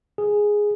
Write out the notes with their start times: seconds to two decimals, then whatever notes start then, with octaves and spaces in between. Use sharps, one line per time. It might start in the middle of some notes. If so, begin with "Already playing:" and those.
0.18 G#4